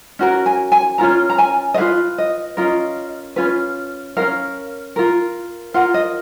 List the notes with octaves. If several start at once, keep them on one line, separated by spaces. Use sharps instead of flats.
C#4 F#4 A#4
G#5
G#5
C#4 F4 A#4 A#5
A#5
G#5
D#5
F4 G#4 B4 F5
D#5
C#4 F4 A#4 D#5
C#4 F4 B4
C#4 F4 A#4 F5
F4 A#4
F4 A#4 F#5
D#5